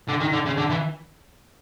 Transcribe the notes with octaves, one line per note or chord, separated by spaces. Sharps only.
D3
D#3
D3
C#3
D3
E3